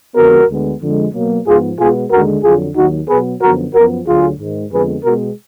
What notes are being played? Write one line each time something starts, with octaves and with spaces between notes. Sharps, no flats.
F2 D3 G#3 B3 F#4 A#4
D2 D3 G#3 B3
F2 D3 G#3
B2 F#3 A#3
G#2 F3 B3 F4 G#4
B2 G#3 B3 F4 G#4
D#2 D3 G#3 F#4 A#4
F2 D3 F#3 F4 G#4
D#2 D#3 F#3 D#4 F#4
B2 F#3 B3 G#4 B4
F#2 D3 F3 B3 F#4 A#4
F#2 F3 B3 F#4 A#4
D2 D3 F#3 F4 G#4
G#2 D#3 G#3
F2 D3 G#3 B3 G#4 B4
B2 G#3 B3 F#4 A#4